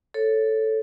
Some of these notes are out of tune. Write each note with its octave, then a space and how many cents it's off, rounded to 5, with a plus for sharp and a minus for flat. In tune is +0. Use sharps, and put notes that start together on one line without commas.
A4 +0 C#5 +0